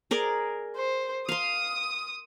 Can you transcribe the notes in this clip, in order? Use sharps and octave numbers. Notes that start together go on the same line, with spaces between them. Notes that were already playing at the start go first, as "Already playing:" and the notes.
G#4 A#4 D5
C5
F5 C6 D#6